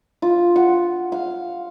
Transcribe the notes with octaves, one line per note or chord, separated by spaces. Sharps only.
F4
F#5
F5